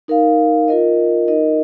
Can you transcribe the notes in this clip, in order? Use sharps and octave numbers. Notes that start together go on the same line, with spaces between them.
D#4 A#4 F5
F4 A#4 D#5
D#4 A#4 D#5